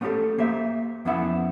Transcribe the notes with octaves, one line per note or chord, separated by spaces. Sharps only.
A3 B3 C#4 D4 G4 A4
A#3 G4 C5 E5
F2 B3 C#4 E4 E5 F#5